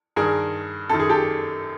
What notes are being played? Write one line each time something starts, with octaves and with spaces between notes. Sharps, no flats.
G2 D#3 G#4 A#4
F#2 D#3 A4
G#4
G4 A4